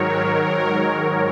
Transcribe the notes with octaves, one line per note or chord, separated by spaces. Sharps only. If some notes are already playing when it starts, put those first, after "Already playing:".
Already playing: G#2 D#3 F#3 A#4 C#5